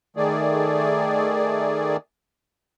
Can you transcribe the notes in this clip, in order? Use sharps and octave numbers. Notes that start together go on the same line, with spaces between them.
D#3 A3 G#4 D5